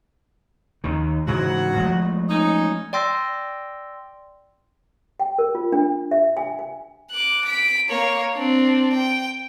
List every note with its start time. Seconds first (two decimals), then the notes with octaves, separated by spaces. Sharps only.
0.84 D#2 D#3
1.28 G#2 C#3 E3 F#3 F#4
1.77 F3 G#3 A3
2.29 C#4 D#4
2.93 D5 G5 C6 E6 A#6
5.20 G5
5.39 A#4
5.55 F4
5.72 D4
6.11 E5
6.37 G#5
6.59 G#5
7.11 D6 F#6
7.45 B6 D7
7.89 A#3 C#5
8.35 C4 D4
8.93 G5